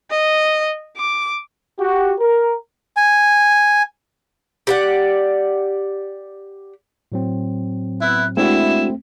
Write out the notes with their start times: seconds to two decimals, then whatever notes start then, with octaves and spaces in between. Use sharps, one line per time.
0.11 D#5
0.97 D6
1.79 F#4 G4
2.19 A#4
2.97 G#5
4.67 G4 D5 F#5
7.12 A2 F#3 C4
8.01 B3 E4 F#6
8.37 G#3 A3 C4 D4 E4 F#4 E7